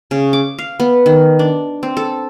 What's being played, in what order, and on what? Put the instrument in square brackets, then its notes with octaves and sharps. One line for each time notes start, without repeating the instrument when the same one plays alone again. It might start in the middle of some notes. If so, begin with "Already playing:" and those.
[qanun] C#3
D6
F5
B3
D#3
D4
C4
A4